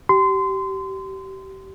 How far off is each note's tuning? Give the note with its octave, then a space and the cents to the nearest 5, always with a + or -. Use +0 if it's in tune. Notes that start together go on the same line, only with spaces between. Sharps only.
G4 -30 C6 -25